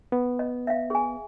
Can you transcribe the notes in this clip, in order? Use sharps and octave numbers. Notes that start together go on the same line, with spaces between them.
B3
D#5
E5 F5
G#4 G#5